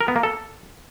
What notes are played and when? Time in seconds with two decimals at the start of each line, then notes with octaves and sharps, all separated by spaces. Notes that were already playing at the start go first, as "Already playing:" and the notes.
0.01 A#4
0.08 B3
0.16 A#3
0.23 A4